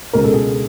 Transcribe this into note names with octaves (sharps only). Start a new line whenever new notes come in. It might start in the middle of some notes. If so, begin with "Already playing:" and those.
C#2 B2 G#3 A#4
A4
G#4